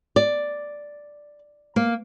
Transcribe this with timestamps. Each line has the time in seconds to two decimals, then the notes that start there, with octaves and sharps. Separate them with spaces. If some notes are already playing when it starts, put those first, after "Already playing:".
0.16 D5
1.76 A#3